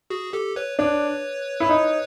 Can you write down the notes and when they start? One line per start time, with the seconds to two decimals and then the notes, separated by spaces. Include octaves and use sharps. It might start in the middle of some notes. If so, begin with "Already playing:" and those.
0.10 F#4 G#4
0.33 G4 A4
0.56 B4 C#5
0.79 D4 B4 C#5
1.60 E4
1.69 D#4